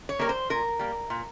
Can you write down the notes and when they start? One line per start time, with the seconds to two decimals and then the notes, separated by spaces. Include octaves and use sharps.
0.09 C#5
0.19 G3 A#3 A#4
0.29 C5
0.50 A#2 A#4
0.79 G3 A#3
1.10 A#2